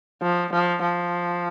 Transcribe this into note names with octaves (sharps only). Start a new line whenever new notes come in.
F3
F3
F3